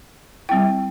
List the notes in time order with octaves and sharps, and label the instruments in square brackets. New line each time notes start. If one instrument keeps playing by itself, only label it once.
[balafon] G3 C4 E4 G5